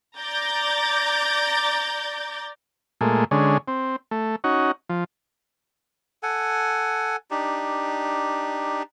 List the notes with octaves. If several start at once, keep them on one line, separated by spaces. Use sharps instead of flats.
D5 A#5 D6 G6 A6
A#2 G#3 A3
D3 G#3 C#4
C4
A3
C#4 D#4 F#4
F3
A4 F#5 G#5
D4 D#4 G4